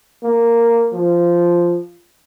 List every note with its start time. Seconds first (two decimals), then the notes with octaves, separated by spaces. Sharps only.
0.23 A#3
0.93 F3